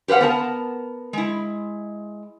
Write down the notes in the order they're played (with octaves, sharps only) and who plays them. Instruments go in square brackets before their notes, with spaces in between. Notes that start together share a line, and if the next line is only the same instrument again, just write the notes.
[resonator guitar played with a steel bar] G4 B4 C5 F5 F#5
B3 A#4 A5
G#3 E4